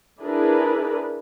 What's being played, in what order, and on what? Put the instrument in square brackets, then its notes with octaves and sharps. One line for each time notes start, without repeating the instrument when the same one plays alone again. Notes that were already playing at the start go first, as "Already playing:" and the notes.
[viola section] D4 E4 G#4 A#4 B4